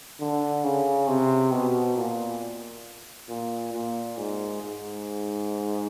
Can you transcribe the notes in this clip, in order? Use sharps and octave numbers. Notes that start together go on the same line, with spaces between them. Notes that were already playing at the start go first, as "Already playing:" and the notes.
D3
C#3
C3
B2
A#2
A#2
A#2
G#2
G#2